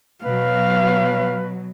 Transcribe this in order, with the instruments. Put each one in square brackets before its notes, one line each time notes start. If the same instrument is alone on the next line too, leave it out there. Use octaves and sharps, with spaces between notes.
[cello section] B2 F#3 [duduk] B4 [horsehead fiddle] F5